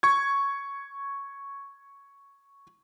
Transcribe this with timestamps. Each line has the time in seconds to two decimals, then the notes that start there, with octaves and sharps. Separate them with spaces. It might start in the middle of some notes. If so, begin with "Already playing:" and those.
0.03 C#6 G#6